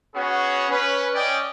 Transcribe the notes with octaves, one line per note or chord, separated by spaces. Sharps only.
B3 C#4 F#4 G#4
C#4 B4
C#4 D5 D#5 G5